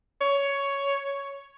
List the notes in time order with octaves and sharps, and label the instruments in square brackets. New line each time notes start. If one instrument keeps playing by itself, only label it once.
[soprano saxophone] C#5